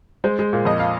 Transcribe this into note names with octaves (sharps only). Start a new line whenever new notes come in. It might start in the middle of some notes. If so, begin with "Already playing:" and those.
G#3 C5
G#3
A#2
F2 D#5
F5